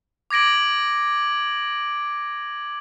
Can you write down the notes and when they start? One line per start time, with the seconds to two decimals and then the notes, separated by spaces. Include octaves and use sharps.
0.30 D6 G#6 A#6 D7 F#7